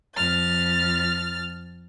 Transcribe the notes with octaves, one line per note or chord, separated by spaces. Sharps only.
F2 F6 A6